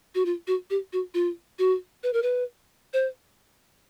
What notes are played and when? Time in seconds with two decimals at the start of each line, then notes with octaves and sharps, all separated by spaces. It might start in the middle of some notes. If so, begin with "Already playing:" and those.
0.15 F#4
0.25 F4
0.47 F#4
0.70 G4
0.93 F#4
1.14 F4
1.59 F#4
2.03 B4
2.13 A#4
2.22 B4
2.93 C5